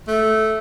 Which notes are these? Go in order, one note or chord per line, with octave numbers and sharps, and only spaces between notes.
A3